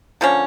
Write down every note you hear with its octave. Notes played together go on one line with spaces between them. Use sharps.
D3 F3 A#3 C#4